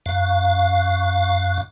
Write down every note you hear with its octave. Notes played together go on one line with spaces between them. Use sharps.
F#2 F5